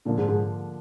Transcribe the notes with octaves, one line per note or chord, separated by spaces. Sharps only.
A#2 D3 F3 A#3 D4
G#2
G#2